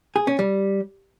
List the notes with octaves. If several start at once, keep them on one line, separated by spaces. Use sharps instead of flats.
G#4
C#4
G3